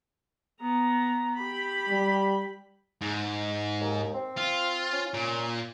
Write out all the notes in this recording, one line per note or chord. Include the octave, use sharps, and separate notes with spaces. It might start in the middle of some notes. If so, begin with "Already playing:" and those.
B3 A#5
G4 B5
G3
G#2
D#2
C4
F4
C#4
A#2